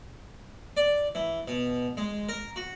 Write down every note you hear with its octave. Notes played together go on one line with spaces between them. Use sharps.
D5
E3
B2
G#3
A#4
F#4